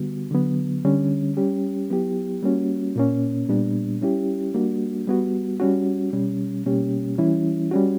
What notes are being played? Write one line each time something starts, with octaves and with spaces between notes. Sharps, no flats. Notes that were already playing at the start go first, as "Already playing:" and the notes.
Already playing: D3 G3 B3 F#4
D3 F#3 B3
D3 G3 C#4
G3 C#4 G4
F#3 B3 E4 G4
G3 A#3 C#4 F#4
A#2 A#3 C#4
A#2 G3 B3 D4
G3 C#4 E4 G4
G3 A#3 D4 F#4
G3 B3 F#4
G3 C#4 F#4
B2 G3 C#4
B2 G3 A#3 C#4 G4
E3 G3 C#4 E4
G3 C#4 F#4